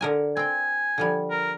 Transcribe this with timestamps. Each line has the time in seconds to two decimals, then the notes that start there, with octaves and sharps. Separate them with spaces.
0.01 D3 A#4 G#5
0.37 C4 G5 G#5
0.98 D3 F3 G3
1.31 A#4